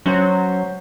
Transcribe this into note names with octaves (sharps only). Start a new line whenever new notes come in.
F#3 C#4 C5